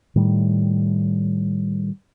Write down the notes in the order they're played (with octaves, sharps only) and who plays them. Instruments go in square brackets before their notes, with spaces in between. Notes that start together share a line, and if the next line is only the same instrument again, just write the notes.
[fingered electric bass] A2 D#3 G3